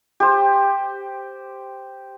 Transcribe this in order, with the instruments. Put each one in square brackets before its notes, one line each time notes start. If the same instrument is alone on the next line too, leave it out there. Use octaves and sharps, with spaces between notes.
[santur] G4 C5